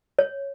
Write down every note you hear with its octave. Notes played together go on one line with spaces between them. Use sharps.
C#5